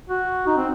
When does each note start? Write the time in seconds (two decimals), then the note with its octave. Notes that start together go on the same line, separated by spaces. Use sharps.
0.09 F#4
0.47 D#4
0.57 C4